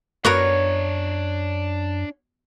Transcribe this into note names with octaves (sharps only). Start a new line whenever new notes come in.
F#2 B3 D4 F#4 A#4 C#5 A#5